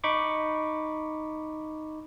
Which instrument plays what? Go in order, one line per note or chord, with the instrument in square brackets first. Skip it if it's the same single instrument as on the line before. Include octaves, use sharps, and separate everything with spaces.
[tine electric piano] D#4 B5 C#6 D6